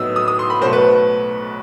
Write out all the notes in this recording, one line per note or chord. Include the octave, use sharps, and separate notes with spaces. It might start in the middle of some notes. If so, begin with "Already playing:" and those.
Already playing: A2 F#3 B3 D#4 D#6 E6
D#6
D#6
C6
B5
B1 B2 A3 C5
B4